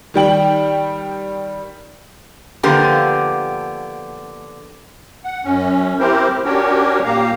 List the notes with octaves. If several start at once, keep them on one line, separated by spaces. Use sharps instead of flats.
D#3 G3 G5 F#7
D3 F3 A#3 B3 G4 A#4
F#5
F#2 C#4
C4 E4 G4 A#4 C5
C#4 D4 F#4 G4 A#4 C#5
A#2 A#3 G4 F5 A#5